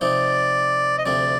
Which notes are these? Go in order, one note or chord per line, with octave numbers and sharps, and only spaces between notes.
C3 F3 C4 D#4 D5
D#5
D2 C3 F3 C4 D5